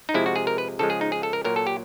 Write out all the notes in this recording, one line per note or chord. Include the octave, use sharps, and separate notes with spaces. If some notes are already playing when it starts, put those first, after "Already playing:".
D#4
C3 F3 G#3 E4
F#4
G#4
A#4
B4
C#3 F3 G#3 A4
G#4
D#4
G#4
A4
A#4
A#2 F#3 A#4
A4
G4